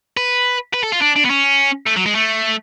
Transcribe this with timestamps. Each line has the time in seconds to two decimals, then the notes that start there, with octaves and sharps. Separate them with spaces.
0.17 B4
0.74 B4
0.84 A4
0.93 F4
1.02 D4
1.16 D4
1.25 B3
1.30 C#4
1.87 A3
1.96 F#3
2.06 G#3
2.15 A3